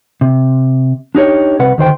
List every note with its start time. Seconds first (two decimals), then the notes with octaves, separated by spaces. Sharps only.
0.21 C3
1.15 D4 D#4 G4 C#5
1.59 C2 C3 B4 F#5
1.78 D2 D#3 C5 G5